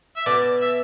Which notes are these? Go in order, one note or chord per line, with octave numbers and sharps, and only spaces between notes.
E5
B2 D5
E5